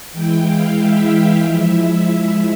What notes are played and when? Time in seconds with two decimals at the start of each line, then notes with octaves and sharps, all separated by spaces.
0.13 E3 G#3 E4 G5
0.45 F5
0.79 E5
1.11 F5
1.44 F3 G#3 E4 E5